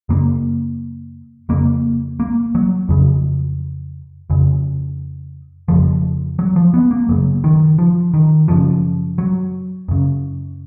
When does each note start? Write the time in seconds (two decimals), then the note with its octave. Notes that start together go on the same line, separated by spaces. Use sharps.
0.09 F#2 C#3 A#3
1.49 F2 C#3 A#3
2.20 A#3
2.55 F#3
2.89 F2 C#3
4.30 F2 C#3
5.68 F2 C#3 F3
6.39 F#3
6.56 F3
6.74 B3
6.91 A#3
7.08 F#2 C#3 F#3
7.44 D#3
7.79 F3
8.14 D#3
8.48 F#2 C#3 F3
9.18 F#3
9.88 F#2 C#3